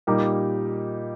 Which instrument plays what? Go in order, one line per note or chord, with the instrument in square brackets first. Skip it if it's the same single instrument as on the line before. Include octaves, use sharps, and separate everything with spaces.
[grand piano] A#2 G3 A#3 D#4 G4